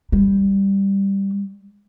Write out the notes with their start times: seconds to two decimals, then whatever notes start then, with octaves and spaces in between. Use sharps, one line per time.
0.12 G3